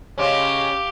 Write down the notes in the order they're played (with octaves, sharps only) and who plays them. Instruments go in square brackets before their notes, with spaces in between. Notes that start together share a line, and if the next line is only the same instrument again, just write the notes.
[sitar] C#3 G#3 C#4 [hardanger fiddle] G4 F5